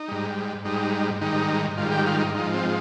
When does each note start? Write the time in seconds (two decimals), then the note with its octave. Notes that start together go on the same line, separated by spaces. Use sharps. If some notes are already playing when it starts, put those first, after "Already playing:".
Already playing: D#4
0.08 G#2 G3
0.65 G#2 G3 D#4
1.21 G#2 D#3 G3 D#4
1.77 G#2 D#3 G3 F4
1.92 G4
2.06 F4
2.20 D#4
2.34 G#2 F3 D#4
2.53 C4